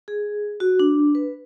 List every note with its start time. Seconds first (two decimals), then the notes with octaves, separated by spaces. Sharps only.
0.08 G#4
0.60 F#4
0.80 D4
1.15 B4